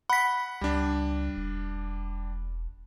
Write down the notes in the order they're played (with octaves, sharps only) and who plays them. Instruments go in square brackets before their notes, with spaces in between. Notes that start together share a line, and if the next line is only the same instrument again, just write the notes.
[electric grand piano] F#5 [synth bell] B5 B6
[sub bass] C#2 [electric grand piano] G3 D4
[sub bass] E1